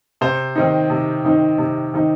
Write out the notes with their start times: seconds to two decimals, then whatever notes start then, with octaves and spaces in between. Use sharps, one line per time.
0.21 C3 C5
0.56 D#3 C4 D#4
0.90 C3
1.25 D#3 C4 D#4
1.58 C3
1.94 D#3 C4 D#4